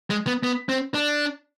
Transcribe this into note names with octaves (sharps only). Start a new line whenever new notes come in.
G#3
B3
B3
C4
D4